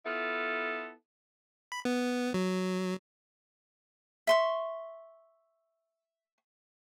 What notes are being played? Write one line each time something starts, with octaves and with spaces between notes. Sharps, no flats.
B3 E4 F4 A4
B5
B3
F#3
E5 C6 C#6